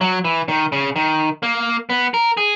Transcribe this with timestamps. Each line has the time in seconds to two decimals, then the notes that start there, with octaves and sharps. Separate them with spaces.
0.01 F#3
0.25 E3
0.48 D#3
0.72 C#3
0.96 D#3
1.43 A#3
1.90 B3
2.14 A#4
2.37 G#4